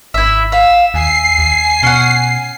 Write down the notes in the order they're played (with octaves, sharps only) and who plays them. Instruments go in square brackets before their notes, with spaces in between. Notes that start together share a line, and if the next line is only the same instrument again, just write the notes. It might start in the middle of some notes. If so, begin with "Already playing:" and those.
[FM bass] G#1 [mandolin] E4 E5
[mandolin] E5 [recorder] F5
[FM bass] D#2 [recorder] G#5 [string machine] C7
[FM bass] D#2
[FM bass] B2 [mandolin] C#4 F#5